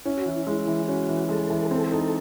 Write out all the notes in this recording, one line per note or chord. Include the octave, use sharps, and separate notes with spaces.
C#4 E4
F#4
E3 E4
G#3
E3
C#4 F#4
E3
G#3 A4
E3
C4 A4
D#4